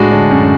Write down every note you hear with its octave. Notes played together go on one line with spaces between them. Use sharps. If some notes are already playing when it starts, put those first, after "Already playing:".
Already playing: A2 G#3 D4 F#4
D3
F#2